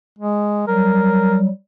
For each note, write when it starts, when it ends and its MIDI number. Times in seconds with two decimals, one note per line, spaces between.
0.19 0.67 56
0.67 1.49 54
0.67 1.49 55
0.67 1.37 70